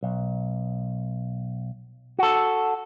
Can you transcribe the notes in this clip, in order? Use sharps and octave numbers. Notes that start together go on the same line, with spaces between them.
B1
F#4 A4